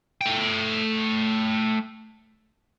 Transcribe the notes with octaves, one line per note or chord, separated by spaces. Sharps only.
A3 G5